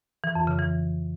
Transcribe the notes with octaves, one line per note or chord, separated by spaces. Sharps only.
E3
F2
C#3
E3